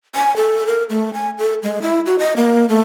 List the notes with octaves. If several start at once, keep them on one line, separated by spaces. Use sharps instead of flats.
G#5
A4
A#4
A3
G#5
A4
G#3
E4
F#4
D#5
A#3
A3